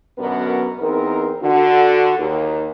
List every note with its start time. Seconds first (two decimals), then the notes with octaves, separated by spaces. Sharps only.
0.19 F#2 B2 D3 B3 A#4
0.80 E2 C4 D#4 A#4
1.42 D3 F#4
2.18 D#2